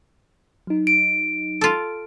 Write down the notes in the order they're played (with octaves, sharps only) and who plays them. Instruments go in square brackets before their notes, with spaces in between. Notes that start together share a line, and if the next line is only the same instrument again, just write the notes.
[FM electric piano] F#3 D#4
[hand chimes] D7
[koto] F4 A4